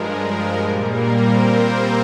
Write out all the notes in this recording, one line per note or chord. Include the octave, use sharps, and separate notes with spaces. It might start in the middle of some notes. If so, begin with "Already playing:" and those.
Already playing: G2 F3 G#3 A#4
A#4
A#2 G3 A#3 G#4
A#4
C4 C5